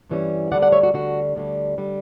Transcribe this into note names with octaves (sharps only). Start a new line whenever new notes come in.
G2 E3 G3 C#4
D2 D3 G3 D5 F#5
D5 F#5
C#5 E5
F#4
D2 D3 G3 F#4
D2 D3 G3
D3 G3